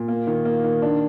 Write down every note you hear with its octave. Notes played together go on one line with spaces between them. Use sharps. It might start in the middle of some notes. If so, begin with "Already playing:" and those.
Already playing: A#2
A#3
D#3
A#3
D#3
D4